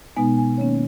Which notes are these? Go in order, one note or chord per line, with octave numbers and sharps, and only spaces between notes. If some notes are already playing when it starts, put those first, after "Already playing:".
B2 G#3 B3 D#4 G#5
G#5
D#3 A#3 C#4 C#5